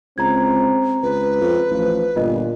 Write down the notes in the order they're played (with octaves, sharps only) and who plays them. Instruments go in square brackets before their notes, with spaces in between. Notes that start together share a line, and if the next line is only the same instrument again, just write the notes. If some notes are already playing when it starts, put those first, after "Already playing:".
[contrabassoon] C#2 [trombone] C4 [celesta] A#5 G#6
[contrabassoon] C#2 [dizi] B4
[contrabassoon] F2 [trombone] C4
[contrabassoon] A1 [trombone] F3
[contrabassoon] G1 [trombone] A#2 [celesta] F4 D#5